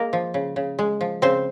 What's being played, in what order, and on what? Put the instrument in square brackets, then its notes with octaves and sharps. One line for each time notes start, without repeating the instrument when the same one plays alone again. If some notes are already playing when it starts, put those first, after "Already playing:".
Already playing: [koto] G#3 A#3 A#4
F3
C#3
C#3
G#3
F3
C#3 C4 C5